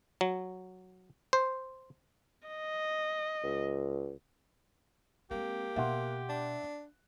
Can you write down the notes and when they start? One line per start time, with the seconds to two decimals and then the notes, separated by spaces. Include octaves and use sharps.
0.21 F#3
1.33 C5
2.49 D#5
3.44 C#2
5.31 G#3 A#3 C4 G4
5.76 B2 E5 F#5 C6
6.29 D4